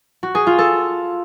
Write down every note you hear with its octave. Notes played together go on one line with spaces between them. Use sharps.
F#4
G#4
F4
A4